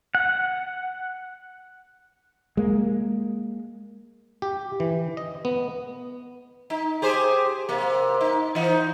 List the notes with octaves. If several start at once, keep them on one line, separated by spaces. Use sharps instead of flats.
F#5
G#3 A#3
G4
E3
D#5
B3
D#4
G4 G#4 C5
C3 A#3
D#4
E3 D#4